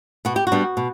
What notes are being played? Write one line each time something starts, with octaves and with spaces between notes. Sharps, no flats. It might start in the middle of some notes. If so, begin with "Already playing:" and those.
B2 F#4
G4
F#4
G3 B3 D4
B2